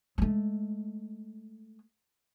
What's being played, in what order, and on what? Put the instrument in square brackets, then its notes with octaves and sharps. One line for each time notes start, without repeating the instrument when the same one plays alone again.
[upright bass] G#3 A3